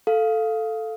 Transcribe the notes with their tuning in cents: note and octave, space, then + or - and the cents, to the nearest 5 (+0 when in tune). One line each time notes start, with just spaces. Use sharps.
A4 +0 F5 +0